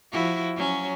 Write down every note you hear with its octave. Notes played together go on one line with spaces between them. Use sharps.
F3 E4 F#4
F#3 C#4